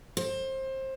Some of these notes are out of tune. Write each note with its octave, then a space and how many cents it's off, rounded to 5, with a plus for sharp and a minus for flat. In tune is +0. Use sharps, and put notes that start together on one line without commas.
C5 +25